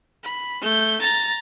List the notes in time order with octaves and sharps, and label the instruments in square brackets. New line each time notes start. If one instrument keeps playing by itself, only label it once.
[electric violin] B5
A3 G6
A#5 A6